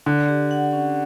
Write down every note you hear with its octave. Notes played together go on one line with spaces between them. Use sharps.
D3 D5
G4
F#5
C#4